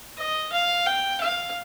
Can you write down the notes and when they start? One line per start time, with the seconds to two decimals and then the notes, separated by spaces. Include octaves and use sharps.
0.18 D#5
0.52 F5
0.86 G5
1.21 F5